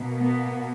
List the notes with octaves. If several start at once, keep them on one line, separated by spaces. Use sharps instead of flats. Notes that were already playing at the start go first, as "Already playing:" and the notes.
Already playing: B2 A#3
B3